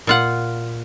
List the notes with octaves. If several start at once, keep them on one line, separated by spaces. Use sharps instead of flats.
A#2 F4 F#5